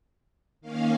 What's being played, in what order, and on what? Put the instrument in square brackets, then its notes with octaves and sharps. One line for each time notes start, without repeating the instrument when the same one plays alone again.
[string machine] D#3 A#3 C#4 F5